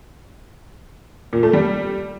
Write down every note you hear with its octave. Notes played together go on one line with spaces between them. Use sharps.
A#2
A3
G3